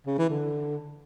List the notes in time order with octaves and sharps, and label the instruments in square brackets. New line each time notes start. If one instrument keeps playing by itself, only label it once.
[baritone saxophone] C#3
E3
D3